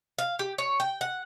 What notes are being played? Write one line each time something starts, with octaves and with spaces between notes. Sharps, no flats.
F5
G4
C#5
G5
F#5